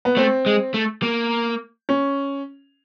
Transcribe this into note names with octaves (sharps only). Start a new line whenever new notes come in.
B3
A3 C4
G#3
A3
A#3
C#4